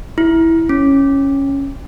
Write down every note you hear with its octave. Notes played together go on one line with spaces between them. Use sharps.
E4
C#4